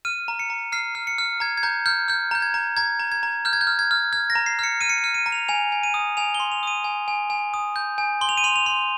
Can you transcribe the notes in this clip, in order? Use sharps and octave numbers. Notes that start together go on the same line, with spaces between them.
F6 D#7
A#5
C#7
A#5
F6 C7
F6
C#7
F6
A#5 G#6
G#6
A#5 G6
F6 G6
F6 G6
A#5 G6
G#6
A#5
A#5 G#6
A#5
G#6
A#5
F6 G6
G#6
G6
F6
G#6
F6
F6 G#6
A#6
A#5
C7
F6 C#7
F6 D#7
C#7
D#7
F6
D#7
A#5
F7
G#5 F7
G#5
D#7
D#6
G#5 F7
G7
C6
F7
D#6 D#7
G#5
G#5
G#5
D#6
G6
G#5
C6 G7
F7
D#7
C6 F7
F7
C6